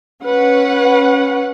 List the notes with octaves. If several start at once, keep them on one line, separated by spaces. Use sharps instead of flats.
C#4 B4 F#5